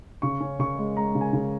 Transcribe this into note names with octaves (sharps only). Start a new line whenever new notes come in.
C#3 C#6
C#4
C#3 C#6
G#3
G#3 A#5
C#3
G#5
C#3